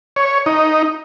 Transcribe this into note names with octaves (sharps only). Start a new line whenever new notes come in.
C#5
D#4